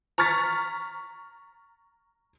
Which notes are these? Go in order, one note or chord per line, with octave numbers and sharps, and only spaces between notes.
A#5 C#6 F6 A6 B6